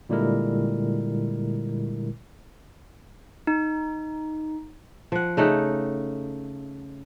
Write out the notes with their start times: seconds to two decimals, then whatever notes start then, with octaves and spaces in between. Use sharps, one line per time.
0.09 A#2 D3 G3 G#3 E4 A#4
3.47 D#4
5.12 F3 F#5
5.37 C#3 A3 D#4 F#5